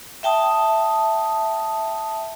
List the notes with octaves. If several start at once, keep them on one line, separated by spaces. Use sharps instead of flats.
E5 G5 A5 D#6